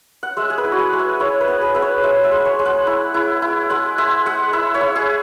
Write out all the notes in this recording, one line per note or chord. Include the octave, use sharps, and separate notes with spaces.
F#5
G#3 E5
G#4
B4
E4
F#4
G#4
G#3
E5
E4 C#5
B4
B3
G#4
B3 E5
C#5
G#3 E5
E5
G#3
C#5
G#3
F#5
E4
E4
E4
G#3 F#5
G#3 E5
G#3 F#5
E4 E5
C#5
E4
G#4